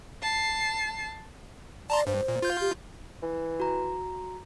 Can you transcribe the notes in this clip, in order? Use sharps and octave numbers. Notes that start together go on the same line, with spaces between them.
A5 C7
D5 A5 A#5 C6
G2 C5
A#2
F4 G6
G4
E3
F#4 A#5